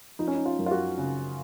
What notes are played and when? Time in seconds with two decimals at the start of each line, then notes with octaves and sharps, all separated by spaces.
0.19 F3 D#4
0.27 C#4
0.35 D#4
0.46 F4
0.59 F#2
0.66 F4
0.71 F#4
0.98 C#3